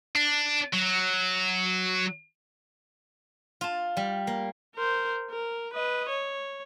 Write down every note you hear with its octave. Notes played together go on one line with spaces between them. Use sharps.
D4
F#3
F4 A5
G3
A#3
A#4 C5
A#4
B4 D#5
C#5